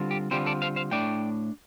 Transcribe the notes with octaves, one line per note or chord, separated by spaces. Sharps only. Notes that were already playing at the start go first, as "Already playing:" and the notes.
Already playing: D3 G3 C4 F4
G4
D3 G3 C4 F4 G4 C5
A4 D5
C5 F5
C5 F5
A2 A3 D4 D5 G5